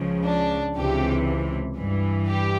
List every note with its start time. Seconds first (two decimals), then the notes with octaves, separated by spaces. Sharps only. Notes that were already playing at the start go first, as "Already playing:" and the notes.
Already playing: C#2 C#3 F3
0.26 D4
0.76 C#2 C3 E3 G4
1.77 G2 E3
2.28 G4